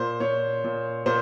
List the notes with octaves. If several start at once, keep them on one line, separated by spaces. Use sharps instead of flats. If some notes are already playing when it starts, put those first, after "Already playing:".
Already playing: A#2 C5
A#2 C#5
A#2
A#2 C5